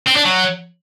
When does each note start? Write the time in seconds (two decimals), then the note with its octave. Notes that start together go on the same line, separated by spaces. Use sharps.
0.07 C4
0.17 D4
0.26 F#3